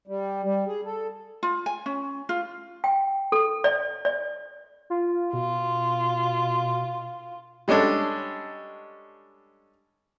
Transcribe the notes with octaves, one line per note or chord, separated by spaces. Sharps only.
G3
G3
G#4
A4
F4
G#5
C#4
F4
G5
A4
D5
D5
F4
B2 F4
G3 G#3 C#4 D4 A4